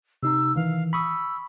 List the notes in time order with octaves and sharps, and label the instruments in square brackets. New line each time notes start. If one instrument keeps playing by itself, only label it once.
[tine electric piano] C3 D#4 A#5 [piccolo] E6
[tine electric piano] D#3 E3 [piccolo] F5
[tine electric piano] B5 C#6 D#6 [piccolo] E6